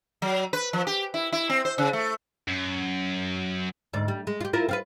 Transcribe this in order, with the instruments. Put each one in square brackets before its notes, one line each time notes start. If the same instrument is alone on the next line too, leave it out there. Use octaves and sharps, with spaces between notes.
[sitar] F#3
B4
F3
G4
E4
E4
C4
C5
C#3
A3
[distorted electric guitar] F#2
[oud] D2 G#2 D5
G3
G#3
F4 G4
E4 F4 A#4
C4 F4 B4